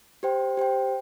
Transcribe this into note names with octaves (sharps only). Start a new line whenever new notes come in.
G4 C5 G5
G4 C5 G5